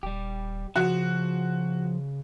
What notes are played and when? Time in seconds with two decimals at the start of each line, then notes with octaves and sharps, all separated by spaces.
0.03 D#1 G3 G4
0.76 C#3 F3 F#4